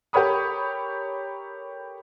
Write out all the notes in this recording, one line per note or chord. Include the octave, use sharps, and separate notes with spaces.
G4 A4 A#4 C#5 B5 D#6